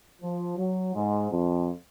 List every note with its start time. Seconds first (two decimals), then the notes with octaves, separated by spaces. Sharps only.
0.22 F3
0.58 F#3
0.95 G#2
1.31 F2